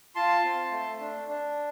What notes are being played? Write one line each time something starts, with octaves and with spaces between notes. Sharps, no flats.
F4 A5 C6
C4
A3
D4
D4